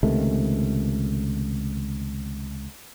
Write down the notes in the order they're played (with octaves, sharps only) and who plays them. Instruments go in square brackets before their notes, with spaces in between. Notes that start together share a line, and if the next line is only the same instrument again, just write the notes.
[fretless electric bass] C#2 C3 D#3 A3